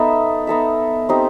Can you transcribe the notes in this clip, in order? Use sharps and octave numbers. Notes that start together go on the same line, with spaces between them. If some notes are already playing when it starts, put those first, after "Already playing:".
Already playing: B3 D#4 A4 E5
B3 D#4 A4 E5
C4 D#4 G4 C5